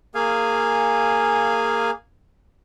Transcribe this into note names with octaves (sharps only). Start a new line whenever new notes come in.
A#3 G#4 F5 G#5